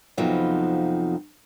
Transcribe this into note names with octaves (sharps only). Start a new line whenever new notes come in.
F2 C3 F3 F#3 B3 D#4